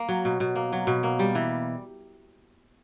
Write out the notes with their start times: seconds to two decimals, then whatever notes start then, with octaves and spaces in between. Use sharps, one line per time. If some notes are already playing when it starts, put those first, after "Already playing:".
Already playing: A#3
0.09 F#3
0.25 B2
0.40 B2
0.56 A#3
0.72 F#3
0.87 B2
1.03 A#3
1.19 G3
1.35 E3